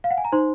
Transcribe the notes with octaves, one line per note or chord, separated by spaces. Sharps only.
F5
F#5
G#5
A#5
D#4 C5 C6